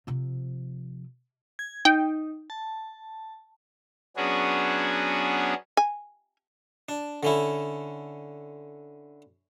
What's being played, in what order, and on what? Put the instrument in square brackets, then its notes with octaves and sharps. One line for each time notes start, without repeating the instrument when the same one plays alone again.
[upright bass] C3 F3
[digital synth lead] G#6
[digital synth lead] D#4 [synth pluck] G5
[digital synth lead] A5
[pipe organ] F#3 B3 C#4 D4 F#4 G#4
[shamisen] G#5
[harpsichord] D4
D3 C#4 E4